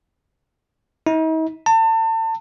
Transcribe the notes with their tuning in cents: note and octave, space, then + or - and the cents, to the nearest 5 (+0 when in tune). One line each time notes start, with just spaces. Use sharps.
D#4 +45
A5 +35